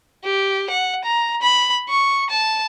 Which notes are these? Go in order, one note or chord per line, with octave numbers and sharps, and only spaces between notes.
G4
F#5
A#5
B5
C#6
A5